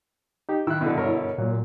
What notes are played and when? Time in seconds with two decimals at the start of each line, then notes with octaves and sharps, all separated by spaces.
0.49 D#4 G4
0.67 D#3 E4 E6 F#6
0.81 B2 D3
0.96 G2 A#4 C#5
1.38 A#2 F#3